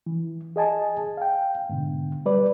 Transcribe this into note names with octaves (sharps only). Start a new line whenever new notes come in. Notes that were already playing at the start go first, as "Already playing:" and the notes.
E3
G#4 D#5 G#5 A5
F5 G5
G#2 B2 D3
G3 B4 D5